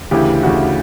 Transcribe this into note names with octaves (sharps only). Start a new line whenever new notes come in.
D2 C#3 E3 G4
D2 C#3 E3 F#4